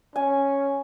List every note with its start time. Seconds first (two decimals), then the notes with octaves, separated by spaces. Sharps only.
0.16 C#4 G#5